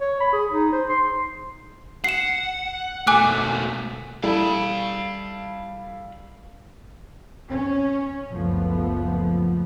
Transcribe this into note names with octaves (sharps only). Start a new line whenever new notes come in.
C#5
B5
G#4
D#4
C5
C6
F#5 C7 E7
B2 A3 G#5 D6 F#6
G3 E4 A4 F5 B5
C#4
F#1 C#2 F3 A3 B3